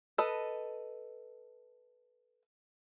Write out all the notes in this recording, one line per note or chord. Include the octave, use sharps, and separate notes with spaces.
A4 B4 D#5